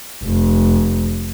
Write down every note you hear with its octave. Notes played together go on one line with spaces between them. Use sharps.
F1